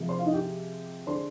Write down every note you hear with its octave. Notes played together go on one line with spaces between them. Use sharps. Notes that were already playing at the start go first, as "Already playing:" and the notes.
Already playing: C3 F3 G#3
C5 C6
F4 F5
D#4 D#5
G4 G5
D3 G#3 D4 C5 C6